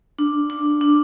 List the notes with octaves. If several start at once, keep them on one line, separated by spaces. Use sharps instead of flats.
D4
D4
D4